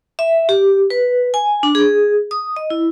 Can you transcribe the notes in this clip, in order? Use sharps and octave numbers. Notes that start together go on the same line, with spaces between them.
E5
G4
B4
G#5
D4
G#4
D#6
D#5
E4